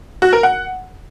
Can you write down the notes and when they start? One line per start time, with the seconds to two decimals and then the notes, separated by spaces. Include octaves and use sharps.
0.22 F#4
0.33 A#4
0.43 F#5